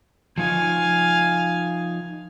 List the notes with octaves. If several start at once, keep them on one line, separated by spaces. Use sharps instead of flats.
F3 D#4 F5 G#5